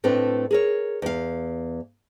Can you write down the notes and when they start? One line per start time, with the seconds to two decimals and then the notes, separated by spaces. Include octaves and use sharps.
0.04 A2 A3 C4 D4 B4
0.51 G#4 A#4 C#5
1.02 E2 F5